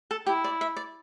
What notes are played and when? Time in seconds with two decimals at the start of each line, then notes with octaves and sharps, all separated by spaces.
0.11 A4
0.27 E4 G4
0.44 D5
0.61 E5
0.77 D5